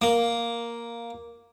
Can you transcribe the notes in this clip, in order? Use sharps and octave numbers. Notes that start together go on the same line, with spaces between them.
A#3